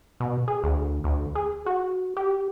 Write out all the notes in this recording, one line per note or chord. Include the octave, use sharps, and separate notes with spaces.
B2
G#4
D2
D2
G#4
F#4
G4